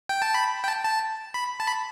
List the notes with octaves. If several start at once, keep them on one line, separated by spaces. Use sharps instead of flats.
G5
A5
B5
G5
A5
A5
B5
A5
B5